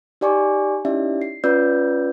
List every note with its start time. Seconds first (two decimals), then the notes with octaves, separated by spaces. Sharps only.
0.21 D#4 G4 D5 G#5 C#6 D6
0.85 C#4 D#4 E4 G4 D5 E5
1.22 C7
1.44 C#4 F4 B4 D5 E6 G6